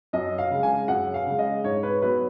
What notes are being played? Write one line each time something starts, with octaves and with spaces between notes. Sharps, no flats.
F#2 D#5
F5
C#3 G#3
G#5
F#2 F#5
F5
C#3 G#3
D#5
G#2 C#5
B4
F#3 B3 B4